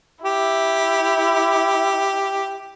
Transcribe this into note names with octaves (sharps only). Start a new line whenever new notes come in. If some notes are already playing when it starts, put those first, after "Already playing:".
E4 G4